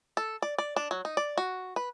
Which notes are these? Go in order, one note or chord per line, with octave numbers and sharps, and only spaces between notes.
A4
D5
D5
D4
F#3
D#4
D5
F#4
B4